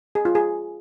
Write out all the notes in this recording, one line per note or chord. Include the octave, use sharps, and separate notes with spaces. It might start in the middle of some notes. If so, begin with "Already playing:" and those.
G#4
F4
G#4